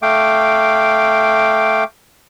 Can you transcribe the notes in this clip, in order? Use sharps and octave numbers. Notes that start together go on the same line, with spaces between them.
A3 F5 G5 D6